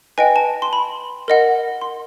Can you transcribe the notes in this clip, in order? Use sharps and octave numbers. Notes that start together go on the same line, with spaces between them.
B4 D#5 G5 G#5
A5
C6
B5
A#4 D#5 F#5
C6